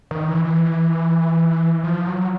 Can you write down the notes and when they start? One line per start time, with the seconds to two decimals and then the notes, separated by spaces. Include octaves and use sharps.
0.11 D#3
0.28 E3
0.45 E3
1.84 F3
2.07 F#3